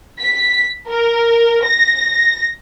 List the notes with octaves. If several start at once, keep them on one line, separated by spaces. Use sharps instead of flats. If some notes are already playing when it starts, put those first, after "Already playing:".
B6
A#4
A#6